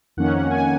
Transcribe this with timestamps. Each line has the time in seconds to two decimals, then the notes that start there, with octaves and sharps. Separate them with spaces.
0.17 F2 D#3 A#3 C#4 F#5
0.34 F#5
0.51 G#5